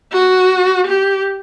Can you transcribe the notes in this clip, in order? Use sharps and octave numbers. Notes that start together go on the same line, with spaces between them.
F#4
G4